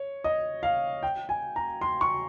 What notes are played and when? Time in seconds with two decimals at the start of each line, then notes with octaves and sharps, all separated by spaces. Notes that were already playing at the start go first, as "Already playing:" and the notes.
Already playing: C#5
0.24 D#5
0.63 F5
1.03 G5
1.29 G#5
1.56 A#5
1.81 C6
2.01 C#6